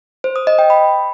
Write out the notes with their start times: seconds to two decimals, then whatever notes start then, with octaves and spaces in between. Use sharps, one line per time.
0.24 C5
0.36 D#6
0.47 D#5
0.59 G5
0.70 B5